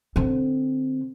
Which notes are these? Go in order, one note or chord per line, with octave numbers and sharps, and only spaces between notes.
D3 C4